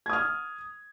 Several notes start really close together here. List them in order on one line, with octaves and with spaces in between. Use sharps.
G#6 D#6 F6